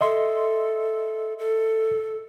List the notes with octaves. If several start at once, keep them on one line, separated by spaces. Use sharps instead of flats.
A4 D#5 E5 C6
A4